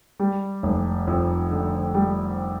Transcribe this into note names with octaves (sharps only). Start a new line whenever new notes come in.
G3
F1
F2
D3
G3